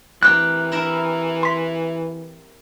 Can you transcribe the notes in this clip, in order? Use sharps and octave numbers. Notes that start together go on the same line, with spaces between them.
E3 C4 G4 A#4 F#6
E4 A#4 E5
C6 B6